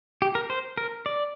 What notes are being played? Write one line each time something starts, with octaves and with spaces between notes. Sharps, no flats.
G4
A#4
C5
A#4
D5